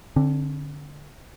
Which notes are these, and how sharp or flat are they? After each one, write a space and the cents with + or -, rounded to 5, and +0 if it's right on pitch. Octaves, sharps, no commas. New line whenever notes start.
D3 +0 C4 +40